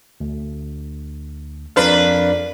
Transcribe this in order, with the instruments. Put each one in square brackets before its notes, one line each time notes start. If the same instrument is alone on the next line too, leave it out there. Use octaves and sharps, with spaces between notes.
[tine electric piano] D2
[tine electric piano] F2 A#4 F5 [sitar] D4 B4